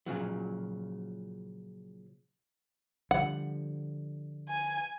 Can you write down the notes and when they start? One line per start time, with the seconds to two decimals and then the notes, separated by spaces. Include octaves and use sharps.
0.06 A#2 C#3 F3 F#3
3.11 D3 F3 G3 F#5
4.49 G#5